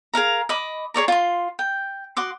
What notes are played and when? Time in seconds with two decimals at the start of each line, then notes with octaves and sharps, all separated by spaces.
0.14 G#4 A#4 F5 A#5
0.49 D#5 B5 D6
0.94 G#4 C#5 D5 A#5
1.08 F4 C6
1.59 G5
2.17 F#4 C6 D6 D#6